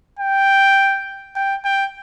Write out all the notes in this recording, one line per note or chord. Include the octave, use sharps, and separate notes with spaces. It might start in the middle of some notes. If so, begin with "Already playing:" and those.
G5
G5
G5